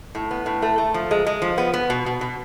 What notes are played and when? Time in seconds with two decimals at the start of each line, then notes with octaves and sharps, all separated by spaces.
0.15 A2
0.31 B3
0.46 A2
0.62 A3
0.78 A3
0.94 F3
1.11 G#3
1.27 G#3
1.42 F3
1.58 B3
1.74 B3
1.90 B2
2.06 B2
2.21 B2